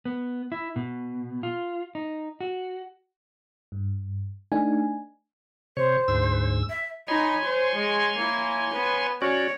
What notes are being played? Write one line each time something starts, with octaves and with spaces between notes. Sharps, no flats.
B3
E4
B2
F4
D#4
F#4
G2
A3 D4 D#4 G#5
C3 C5 C#5
D2 G#2 E6
E5
D#4 C#5 G#5 B5 C6
C5
G#3
A#3 E4
B3 B4
C#4 F#4 C#5 D5